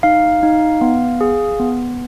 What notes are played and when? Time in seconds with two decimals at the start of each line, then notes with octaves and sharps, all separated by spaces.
0.03 D#4 F5
0.43 D#4
0.81 B3
1.21 G#4
1.60 B3